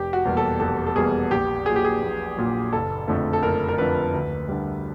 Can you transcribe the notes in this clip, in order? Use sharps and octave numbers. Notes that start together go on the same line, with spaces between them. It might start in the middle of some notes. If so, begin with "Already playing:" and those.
Already playing: F1 G4
F#4
E2 B2 G3 A#3
A4
F1 A4
A4
E2 B2 G3 A#3 G#4
A#1 G4
A#2 F#3 G#4
G4
G#4
A#1
A#2 F#3
F#1 A4
F2 D3 F3 A3
A4
F#1 A#4
A#4
F2 D3 F3 A3 B4
D2
D3 G3